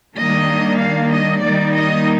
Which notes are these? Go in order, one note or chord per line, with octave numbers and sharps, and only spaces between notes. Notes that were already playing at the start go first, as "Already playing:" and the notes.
D#3 G3 A#3 D4 D#5
F5
D#5
D#3 G3 A#3 D#4 D5
D#5